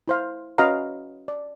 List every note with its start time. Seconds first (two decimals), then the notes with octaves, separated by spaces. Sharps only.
0.08 E4 C5 F5
0.58 C#4 F#4 B4 D#5 F5 A#5
1.28 D5